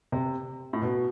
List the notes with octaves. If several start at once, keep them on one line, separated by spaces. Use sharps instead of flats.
C3
A2
B2